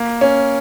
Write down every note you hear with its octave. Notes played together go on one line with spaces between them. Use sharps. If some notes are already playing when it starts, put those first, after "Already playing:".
Already playing: A#3
C#4